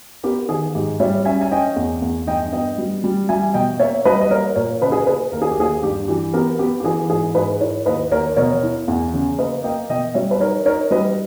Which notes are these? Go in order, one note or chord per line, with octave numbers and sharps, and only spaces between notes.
B3 G4 A#4
D#3 G#4
G#2 G4
G3 C#5 E5
C#4 E5 G#5
G#5
C#4 D#5 G5
E2
E2
G2 D#5 G5
B3 D#5 G5
G3
G3
G3 E5 G#5
B2 D#5 G5
A#3 C#5 E5
G3 B4 D#5
D#5
A#3 A#4 C#5
A#2 A#4 C#5
C#3 B4 D#5
G#4
A#4
A#3 G#4 B4
D#2 A#4
G#4
G4
D#2 G#4
G2 G4
E3 G4
B3 G4 A#4
B3 G4
G4
E3 G#4
G#2 G#4
G#2 G#4 B4
E4 A#4 C#5
D#2 B4 D#5
D#2 A#4 C#5
B2 A#4 C#5
E4
E2
C#3
A#3 B4 D#5
A#3 D#5 G5
B2 D#5 G5
G3 C#5 E5
B4
D#4 A#4 C#5
D#4 A#4 C#5
G3 B4 D#5